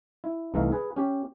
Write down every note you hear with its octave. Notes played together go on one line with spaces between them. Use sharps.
E4
C2 E3 A3 D#4 E5 F5
G#4 B4
C#4 G4